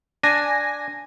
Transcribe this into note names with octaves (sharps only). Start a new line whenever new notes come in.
D4 G#5 A#6